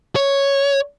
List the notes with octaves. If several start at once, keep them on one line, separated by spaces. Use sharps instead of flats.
C#5